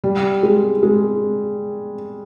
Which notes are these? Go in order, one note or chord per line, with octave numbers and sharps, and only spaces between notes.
G3
G#3
G#3